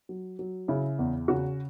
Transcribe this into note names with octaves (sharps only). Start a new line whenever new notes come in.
F#3
F#3
C#3 E4
E2
C#3 F#4